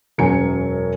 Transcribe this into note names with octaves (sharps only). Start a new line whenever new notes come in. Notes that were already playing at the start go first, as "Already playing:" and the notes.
E1 F#2 F#3 G#5 C#7